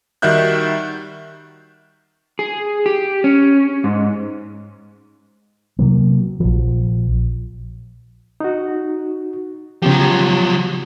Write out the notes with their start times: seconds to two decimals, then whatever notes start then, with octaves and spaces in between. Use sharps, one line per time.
0.22 D#3 G3 F#4 E5 F#6 G6
2.39 G#4
2.86 G4
3.24 C#4
3.84 G#2
5.79 C3 F#3 A#3
6.40 A#1 F3
8.40 D#4 F#4
9.82 C#3 F3 F#3 B3 G4